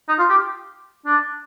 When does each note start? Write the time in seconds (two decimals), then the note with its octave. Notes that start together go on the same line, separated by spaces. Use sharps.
0.08 D#4
0.19 F4
0.30 G4
1.06 D4